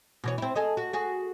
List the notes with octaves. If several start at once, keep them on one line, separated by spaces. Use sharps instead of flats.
B2 E3 C#5
C4 E4
G#4 A4 D#5
F#4
F#4 G#4